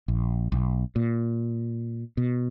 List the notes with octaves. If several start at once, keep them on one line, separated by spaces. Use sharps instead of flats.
A#1
B1
A#2
B2